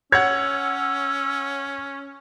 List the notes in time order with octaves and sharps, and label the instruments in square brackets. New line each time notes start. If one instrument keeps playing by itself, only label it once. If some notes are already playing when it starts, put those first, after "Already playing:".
[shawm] C#4 [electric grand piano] C#5 F#5 [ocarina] E6 [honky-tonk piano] G#6